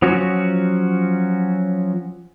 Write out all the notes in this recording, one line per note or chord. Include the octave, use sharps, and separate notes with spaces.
F3 F#3 C#4 F#4